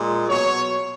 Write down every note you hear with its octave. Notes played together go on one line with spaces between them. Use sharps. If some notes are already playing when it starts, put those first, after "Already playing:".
Already playing: A#2 G#3
B2 F#3 C#5